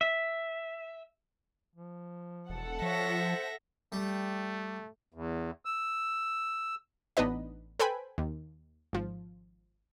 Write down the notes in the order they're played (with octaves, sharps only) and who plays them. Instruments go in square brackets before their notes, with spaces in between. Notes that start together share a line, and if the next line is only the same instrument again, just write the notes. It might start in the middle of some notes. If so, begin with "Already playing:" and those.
[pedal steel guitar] E5
[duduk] F3
[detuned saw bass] E1 [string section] A4 F#5
[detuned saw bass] F3 [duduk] C#5 [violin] E5 A#6
[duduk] C5
[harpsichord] G3 [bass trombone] A3
[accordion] E2
E6
[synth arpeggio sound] A1 B3 D4 D#4 B4 D#5
A4 B4 C5 G5 G#5 B5
D#2
G#1 F3